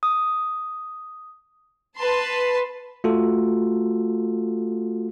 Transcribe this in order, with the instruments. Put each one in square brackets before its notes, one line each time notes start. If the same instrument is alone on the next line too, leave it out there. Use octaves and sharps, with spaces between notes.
[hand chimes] D#6
[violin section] B4 A5 C6
[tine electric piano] A3 F4 F#4 A4